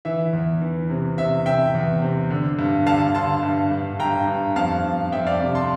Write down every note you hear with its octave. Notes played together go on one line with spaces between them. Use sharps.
E3 E5
E2
E3
C3
C3 E5
C3 E5 G5
E2
C3
D3
G2
D3 F5 A5
D3 A5 C6
G2
G2
G2 G5 A#5
G2
F2 F5 A5
F2
F2 E5 G5
D5 F5
C3 D5
A5 C6